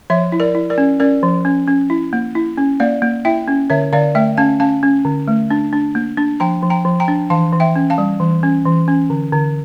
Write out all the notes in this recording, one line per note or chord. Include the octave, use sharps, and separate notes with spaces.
F3 C#5 E5
E4
A#4 D5
E4
A#4 D5
C#4
C#4 A#4 D5
F3
C#4
C#4
E4
A#3
E4
C#4
A#3 D5 F5
A#3
E4 E5 G5
C#4
D3 C#5 E5
D3 D5 F5
A3 E5 G5
C#4 F5 A5
C#4 F5 A5
C#4
D3
A3
D4
D4
A#3
D4
F3 G5 A#5
F3
G5 A#5
F3
G5 A#5
D4
E3 F5 A5
E3
E5 G5
C#4
F5 A5
G3
E3
C#4
E3
C#4
D3
D3